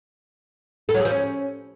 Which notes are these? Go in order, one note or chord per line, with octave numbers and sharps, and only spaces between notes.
A4
F#3
G#4
F3
C#4